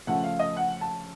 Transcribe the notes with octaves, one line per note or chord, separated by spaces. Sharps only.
C#3 F3 A3 F#5
F5
D#5
F#5
A5